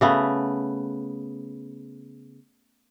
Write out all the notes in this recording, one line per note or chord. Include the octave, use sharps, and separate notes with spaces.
C#3 A3 B3